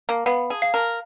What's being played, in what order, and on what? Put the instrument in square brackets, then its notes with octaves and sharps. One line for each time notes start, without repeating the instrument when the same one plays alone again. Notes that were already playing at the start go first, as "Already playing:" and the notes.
[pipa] A#3
[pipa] B3 [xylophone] F5
[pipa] G#4
[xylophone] F5
[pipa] A#4